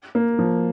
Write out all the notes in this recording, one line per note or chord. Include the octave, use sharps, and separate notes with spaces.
A#3
F3